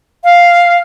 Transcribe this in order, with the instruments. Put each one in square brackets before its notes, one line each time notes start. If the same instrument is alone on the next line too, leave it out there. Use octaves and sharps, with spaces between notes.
[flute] F5